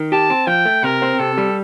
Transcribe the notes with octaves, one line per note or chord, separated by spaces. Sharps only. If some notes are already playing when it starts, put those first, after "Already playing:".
Already playing: D#3
G4 A5
C4
F3 G5
A3
C3 A#4
C4
C3 A4
G3